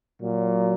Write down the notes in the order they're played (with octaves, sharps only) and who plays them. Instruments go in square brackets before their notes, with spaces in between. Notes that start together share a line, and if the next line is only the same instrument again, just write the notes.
[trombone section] A#2 F#3